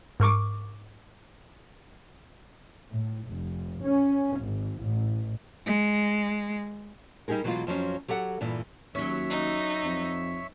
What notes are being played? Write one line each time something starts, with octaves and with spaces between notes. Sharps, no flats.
G#2 A#4 C#6 D6
A2
F1
C#4
G#1
A1
G#3
G3 D#4 G4 G#4 A#4
B2 E3 F#3 G#3 B3 F4
F2 F3 F#3 C#4
F#3 G4 A4 F#5
G2 A#2 E3
D#2 F#3 C#4 C#5 E5 E6
D#4
F2